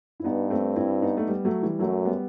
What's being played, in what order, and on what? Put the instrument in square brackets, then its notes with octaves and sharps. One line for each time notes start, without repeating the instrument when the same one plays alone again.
[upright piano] E4
[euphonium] G2 [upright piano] B3 D#4
[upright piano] A3 C4
C4 E4
B3 D#4
A3
G3 B3
F#3 A3
E3 G3
[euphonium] F#2 [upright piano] F#3 A3
[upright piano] G3 B3